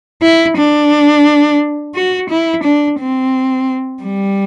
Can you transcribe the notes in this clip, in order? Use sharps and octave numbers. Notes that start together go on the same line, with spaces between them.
E4
D4
F#4
E4
D4
C4
G3